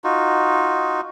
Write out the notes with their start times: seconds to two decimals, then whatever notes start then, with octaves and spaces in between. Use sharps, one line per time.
0.04 D#4 F4 F#4